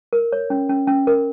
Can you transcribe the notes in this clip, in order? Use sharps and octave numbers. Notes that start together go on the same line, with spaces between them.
A#4
C#5
C#4
C#4
C#4
A#4